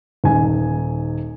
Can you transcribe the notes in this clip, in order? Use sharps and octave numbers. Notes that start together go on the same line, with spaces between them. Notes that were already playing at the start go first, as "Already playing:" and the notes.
D#1 D#4 G#5